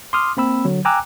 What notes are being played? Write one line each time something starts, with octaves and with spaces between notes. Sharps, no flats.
C6 D6 D#6 F6
A#3 C4 B5 E6
D3 F#3
G5 G#5 A#5 D6 E6 F#6